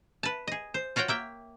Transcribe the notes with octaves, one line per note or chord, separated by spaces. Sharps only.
B4 A5
G#4 D#5
C5
F4 F#4 C#5 F#5 G5
A#3 E5 G5